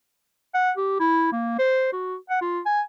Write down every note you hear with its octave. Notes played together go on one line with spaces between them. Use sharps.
F#5
G4
E4
A#3
C5
F#4
F#5
F4
G#5